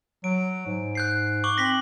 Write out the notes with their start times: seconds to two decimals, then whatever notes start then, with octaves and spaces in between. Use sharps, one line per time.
0.24 F#3 D7
0.67 G#2
0.95 F#6 G6 C7
1.44 C#6 D6 F#7
1.58 C4 A#6 B6 F#7